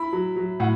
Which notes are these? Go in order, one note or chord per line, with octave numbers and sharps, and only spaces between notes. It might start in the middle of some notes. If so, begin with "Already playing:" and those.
Already playing: E4 B5
F#3
F#3
A2 F#5